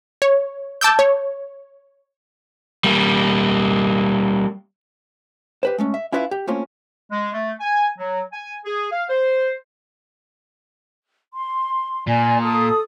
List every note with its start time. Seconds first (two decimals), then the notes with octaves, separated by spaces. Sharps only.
0.22 C#5
0.81 A5 D6 E6 G6
0.99 C#5
2.84 G3 A#3
5.63 G4 B4 C5
5.78 G#3 A3 C#4
5.94 E5
6.12 C#4 E4 F4 B4 E5 F5
6.31 G4
6.47 A3 A#3 C4 C#4 F4
7.11 G#3
7.33 A3
7.60 G#5
7.98 F#3
8.32 G#5
8.65 G#4
8.92 F5
9.09 C5
11.34 C6
12.07 A#2 D5 G#5
12.42 A4 D#6